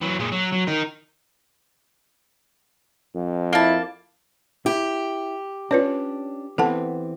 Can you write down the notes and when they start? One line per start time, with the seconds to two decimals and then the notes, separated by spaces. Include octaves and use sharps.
0.02 E3 F#3
0.19 A#2 G#3
0.32 F#3
0.52 F#3
0.67 D#4 A#4
3.15 F2
3.53 A#3 E4 A5
4.66 E4 G4
5.71 C#4 D4 F4 B4 C#5
6.58 E3 B3 C4 A4 F#5 A5